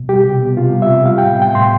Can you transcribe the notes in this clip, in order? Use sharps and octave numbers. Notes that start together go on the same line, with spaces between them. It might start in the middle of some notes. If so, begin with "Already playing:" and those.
Already playing: B2
G3 G4
C3
B3
C3 F4
G3
E5
C3
G3 F5
A2 G5
B3 G5
A2 C6